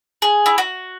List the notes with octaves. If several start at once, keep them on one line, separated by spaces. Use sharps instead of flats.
G#4
E4
F#4